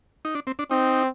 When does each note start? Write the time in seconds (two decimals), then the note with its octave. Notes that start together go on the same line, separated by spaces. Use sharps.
0.25 D#4
0.35 D4
0.47 C4
0.59 D4
0.71 C4 D#4